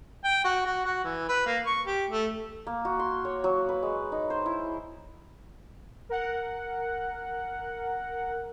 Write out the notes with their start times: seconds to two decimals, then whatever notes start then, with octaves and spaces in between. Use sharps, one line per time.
0.24 G5
0.44 F#4
0.66 F#4
0.85 F#4
1.04 E3
1.29 B4
1.46 A#3
1.66 C#6
1.87 G4
2.10 A3
2.67 A#3
2.85 F#4
2.99 C6
3.25 C#5
3.44 F#3
3.69 B4
3.83 G#3
4.12 D#4
4.30 C5
4.46 E4
6.09 A#4 F#5